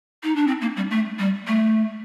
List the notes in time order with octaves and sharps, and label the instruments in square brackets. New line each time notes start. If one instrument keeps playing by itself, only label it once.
[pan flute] D#4
D4
C4
A#3
G3
A3
G3
A3